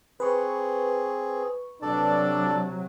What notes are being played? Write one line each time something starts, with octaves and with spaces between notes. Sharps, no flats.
C4 G#4 B4 C#6
C3 F#3 D4 A4 D5 A5